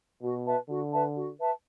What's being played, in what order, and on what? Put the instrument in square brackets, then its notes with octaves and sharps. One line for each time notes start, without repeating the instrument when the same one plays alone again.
[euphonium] B2 [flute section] F#4
[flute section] B4 E5 A5
[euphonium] D3 [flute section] F#4
[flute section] B4 E5 A5
F#4
B4 E5 A5